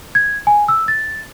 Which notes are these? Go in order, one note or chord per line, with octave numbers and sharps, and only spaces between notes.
G#6
G#5
E6
A6